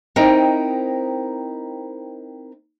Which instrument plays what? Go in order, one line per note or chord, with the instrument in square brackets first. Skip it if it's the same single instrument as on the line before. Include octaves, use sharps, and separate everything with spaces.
[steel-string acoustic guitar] C4 D#4 E4 A#4 D#5 G5